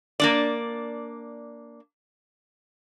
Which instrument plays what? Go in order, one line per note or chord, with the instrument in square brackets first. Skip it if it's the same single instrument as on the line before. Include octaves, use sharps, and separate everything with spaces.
[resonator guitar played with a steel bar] A#3 D4 D5